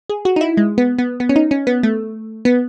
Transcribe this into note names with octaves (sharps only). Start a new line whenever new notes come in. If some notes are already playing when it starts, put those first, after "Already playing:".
G#4
F#4
D#4
E4
G#3
B3
B3
B3
C#4
D#4
C#4
B3
A3
B3